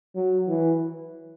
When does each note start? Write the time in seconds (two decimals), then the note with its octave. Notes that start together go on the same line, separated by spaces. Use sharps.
0.16 F#3
0.48 E3